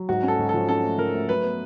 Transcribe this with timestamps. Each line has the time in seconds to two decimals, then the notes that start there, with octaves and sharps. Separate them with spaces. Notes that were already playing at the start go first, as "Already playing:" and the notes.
Already playing: F#3
0.09 G#2 F#4
0.23 C#4
0.28 A4
0.38 G#2
0.49 F3 A4
0.68 C#4 A4
0.84 A3
0.98 F3 A#4
1.14 A3
1.29 F#3 B4
1.43 B3